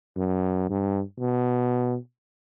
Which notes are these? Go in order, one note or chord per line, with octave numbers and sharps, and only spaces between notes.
F#2
G2
B2